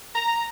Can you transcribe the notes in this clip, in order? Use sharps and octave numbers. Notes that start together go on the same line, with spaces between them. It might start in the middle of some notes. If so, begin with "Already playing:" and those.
A#5